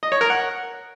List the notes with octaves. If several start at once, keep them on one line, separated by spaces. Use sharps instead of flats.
D#5
C#5
A#4
F#5